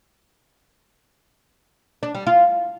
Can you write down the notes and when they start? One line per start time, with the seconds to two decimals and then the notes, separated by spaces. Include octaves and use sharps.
2.03 D4
2.15 G3
2.26 F4